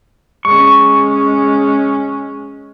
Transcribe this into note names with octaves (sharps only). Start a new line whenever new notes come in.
G#3 C#4 C#6